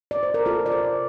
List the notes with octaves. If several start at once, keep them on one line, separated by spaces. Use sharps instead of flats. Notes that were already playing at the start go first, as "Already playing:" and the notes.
D5
C5
A#4
C3 F4 A4
C3 D5
A4 C5
C3